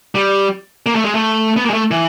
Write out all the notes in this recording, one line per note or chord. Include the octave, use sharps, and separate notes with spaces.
G3
A#3
A3
G#3
A3
B3
A#3
G#3
A3
E3